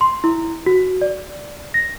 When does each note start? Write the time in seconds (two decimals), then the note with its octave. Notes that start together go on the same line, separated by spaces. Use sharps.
0.01 C6
0.24 E4
0.66 F#4
1.02 D5
1.74 A#6